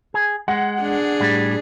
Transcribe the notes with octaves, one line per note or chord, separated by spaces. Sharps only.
G#4
G#3 F#5
D4 G#4
A2 G3